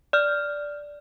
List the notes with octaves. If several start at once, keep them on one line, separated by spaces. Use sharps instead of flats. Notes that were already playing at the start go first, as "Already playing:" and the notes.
D5 F6